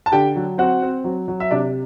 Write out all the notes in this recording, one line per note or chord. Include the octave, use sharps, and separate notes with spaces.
A5
D3 G4 G5
F#3
C4 F#4 F#5
C4
F#3
F#3
E5
C3 D4 D5